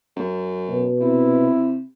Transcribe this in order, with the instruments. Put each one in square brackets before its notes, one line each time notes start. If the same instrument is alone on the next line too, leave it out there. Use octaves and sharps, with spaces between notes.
[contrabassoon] F#2
[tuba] B2
[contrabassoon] C3 [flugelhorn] E4